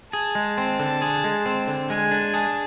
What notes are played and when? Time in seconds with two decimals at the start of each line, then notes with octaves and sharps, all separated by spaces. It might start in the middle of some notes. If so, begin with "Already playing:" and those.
0.13 G#4 A5
0.35 G#3
0.58 C4
0.79 D3
1.02 G#4
1.24 G#3
1.46 C4
1.67 D3
1.90 G#3 G#5
2.11 D4
2.34 G#4 A5